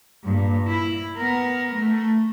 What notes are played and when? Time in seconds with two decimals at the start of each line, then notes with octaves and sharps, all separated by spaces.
0.24 G2 A#2
0.67 E4
1.17 B3 A#4
1.74 A3